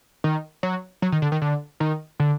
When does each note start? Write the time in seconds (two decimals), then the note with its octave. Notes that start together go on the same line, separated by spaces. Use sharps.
0.24 D#3
0.63 F#3
1.02 F#3
1.12 D#3
1.22 D3
1.32 D#3
1.42 D3
1.80 D#3
2.20 D3